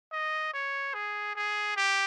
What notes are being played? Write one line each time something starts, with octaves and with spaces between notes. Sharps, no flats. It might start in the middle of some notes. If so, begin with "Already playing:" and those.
D#5
C#5
G#4
G#4
G4